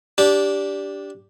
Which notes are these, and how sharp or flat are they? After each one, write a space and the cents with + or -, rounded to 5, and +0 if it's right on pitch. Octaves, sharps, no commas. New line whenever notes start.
D4 -15 G4 +0